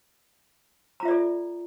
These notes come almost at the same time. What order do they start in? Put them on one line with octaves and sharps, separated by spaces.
A#5 F4 E5 D5 A4